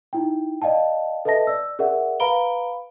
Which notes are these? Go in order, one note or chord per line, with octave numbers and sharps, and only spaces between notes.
D#4 E4 G5
D5 D#5 F5 G5 A5
A4 B4 D#5 E5 A5 A#6
D5 E6
G#4 A#4 D5 E5 F#5
B4 F5 A#5 B5 D7 G7